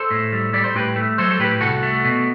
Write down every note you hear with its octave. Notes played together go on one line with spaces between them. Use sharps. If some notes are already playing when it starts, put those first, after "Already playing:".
Already playing: A4 C5
A2
G3
G3 D5
C5
A2 G4 B4
A3
F#3 A4 C5
A4
A2 G4 B4
C2 F#4 A4
A3
B2